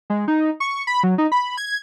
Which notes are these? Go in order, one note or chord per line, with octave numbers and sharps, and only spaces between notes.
G#3
D#4
C#6
B5
F#3
D#4
B5
G#6